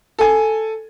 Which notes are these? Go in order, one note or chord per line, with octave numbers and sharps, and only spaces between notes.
A4 G#5